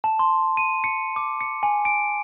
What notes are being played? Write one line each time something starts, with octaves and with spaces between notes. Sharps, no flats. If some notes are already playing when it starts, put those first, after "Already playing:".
A5
C6
D#7
C#7
D6
C#7
G#5
D7